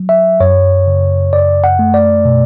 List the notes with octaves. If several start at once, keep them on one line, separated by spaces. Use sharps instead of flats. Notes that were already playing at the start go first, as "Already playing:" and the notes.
Already playing: F#3
E5
F#2 C#5
C#3
F#2 D5
F#5
A3
D5
B2